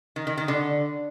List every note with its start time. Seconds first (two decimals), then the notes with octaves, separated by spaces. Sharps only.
0.16 D#3
0.27 D#3
0.37 D#3
0.48 D3